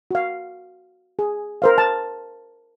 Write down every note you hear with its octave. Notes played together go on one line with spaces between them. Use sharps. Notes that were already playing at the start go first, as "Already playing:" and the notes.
F#4 F5
G#4
A#4 C5 F5
A5